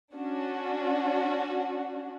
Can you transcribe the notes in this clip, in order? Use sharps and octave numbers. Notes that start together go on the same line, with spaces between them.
C#4 D4 F#4